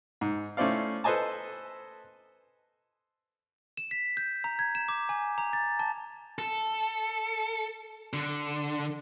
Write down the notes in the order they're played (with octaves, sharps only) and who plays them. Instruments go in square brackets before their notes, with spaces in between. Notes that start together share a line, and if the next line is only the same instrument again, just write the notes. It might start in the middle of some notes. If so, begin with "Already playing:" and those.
[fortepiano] G#2
A3 C#4 E4 C5 D5 F5
A4 B4 C5 D#5 G#5 A5
[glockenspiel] E7
B6
G6
A#5
G#6
E7
D6
G#5
A#5
A6
A5
[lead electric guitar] A4
D3